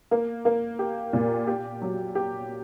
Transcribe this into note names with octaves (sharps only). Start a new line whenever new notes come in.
A#3
A#3
G4
A#2
G4
F#3
G4